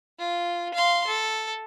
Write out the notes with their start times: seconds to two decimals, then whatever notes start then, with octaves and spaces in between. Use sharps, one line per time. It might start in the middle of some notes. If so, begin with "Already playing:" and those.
0.19 F4
0.74 F5 C6
1.07 A4